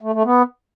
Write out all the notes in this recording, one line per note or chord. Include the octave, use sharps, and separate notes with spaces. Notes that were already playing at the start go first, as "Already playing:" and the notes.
A3
A3
B3